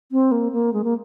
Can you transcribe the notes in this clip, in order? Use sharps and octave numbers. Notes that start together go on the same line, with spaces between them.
C4
A#3
A#3
G#3
A#3